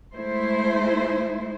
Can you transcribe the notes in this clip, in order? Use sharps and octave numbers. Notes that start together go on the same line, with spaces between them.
G#3 A3 E4 C5